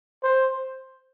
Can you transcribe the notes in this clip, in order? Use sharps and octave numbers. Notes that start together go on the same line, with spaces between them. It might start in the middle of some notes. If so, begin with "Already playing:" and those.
C5